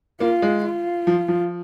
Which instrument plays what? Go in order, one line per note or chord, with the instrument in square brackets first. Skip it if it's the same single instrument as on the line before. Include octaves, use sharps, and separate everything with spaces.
[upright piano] A#3 [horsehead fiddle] F4
[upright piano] G#3
[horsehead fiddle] F4
[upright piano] F3
F3